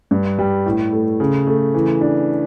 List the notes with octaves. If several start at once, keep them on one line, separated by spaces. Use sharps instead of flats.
G2
G3
A2
A3
C#3
A3
E3
D4